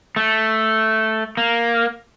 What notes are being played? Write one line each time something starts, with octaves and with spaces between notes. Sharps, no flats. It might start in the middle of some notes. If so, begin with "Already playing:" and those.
A3
A#3